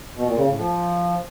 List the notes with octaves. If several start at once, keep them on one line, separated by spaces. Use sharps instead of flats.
B2
A#2
C#3
A2
F3